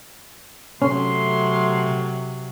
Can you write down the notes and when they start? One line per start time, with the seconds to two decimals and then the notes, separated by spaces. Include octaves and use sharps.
0.82 C3 F#3 A3 C#4 C6